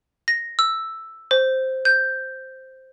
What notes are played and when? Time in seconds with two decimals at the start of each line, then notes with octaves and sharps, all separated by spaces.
0.28 A#6
0.59 E6
1.31 C5
1.85 G6